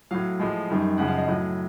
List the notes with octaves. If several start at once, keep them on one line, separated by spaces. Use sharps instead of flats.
A2 F#3 F5
A2 F3 G#3
F#2 D#3 G3
F#2 C#3 F3 G#3 F#5
F5
D#5
A2 F#3